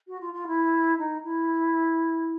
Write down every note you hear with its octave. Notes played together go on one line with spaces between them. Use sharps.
F#4
F4
F4
E4
D#4
E4